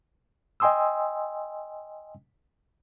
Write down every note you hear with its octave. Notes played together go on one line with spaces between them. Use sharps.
D#5 G5 G#5 C6 D#6 E6